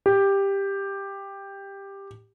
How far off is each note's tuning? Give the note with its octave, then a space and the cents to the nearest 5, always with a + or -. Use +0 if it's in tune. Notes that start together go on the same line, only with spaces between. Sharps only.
G4 +10